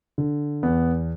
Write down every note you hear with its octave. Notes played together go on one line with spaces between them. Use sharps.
D3
E2 B3